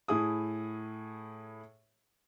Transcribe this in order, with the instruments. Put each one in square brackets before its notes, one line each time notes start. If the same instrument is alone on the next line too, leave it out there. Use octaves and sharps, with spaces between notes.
[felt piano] A2 E4 G#4 D#6